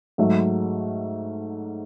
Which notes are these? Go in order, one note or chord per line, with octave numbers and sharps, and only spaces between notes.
G#2 F#3 A3